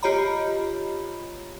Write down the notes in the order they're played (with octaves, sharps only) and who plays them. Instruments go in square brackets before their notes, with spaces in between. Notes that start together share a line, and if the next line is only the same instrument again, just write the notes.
[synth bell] F4 G4 C#5 D#5 A#5 B5